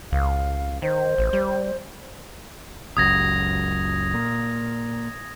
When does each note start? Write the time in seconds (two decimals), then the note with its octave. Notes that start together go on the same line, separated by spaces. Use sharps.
0.12 C#2 F5
0.82 D#3 C5
1.18 A1
1.33 G3
2.97 F#1 C#2 F#2 D#6 G#6 A#6
4.14 A#2